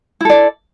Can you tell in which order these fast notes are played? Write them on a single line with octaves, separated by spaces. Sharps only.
E4 A4 D5